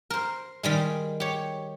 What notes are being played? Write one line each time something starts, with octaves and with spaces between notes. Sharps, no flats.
A#4 C5
D#3 G3 G#3
G4 C#5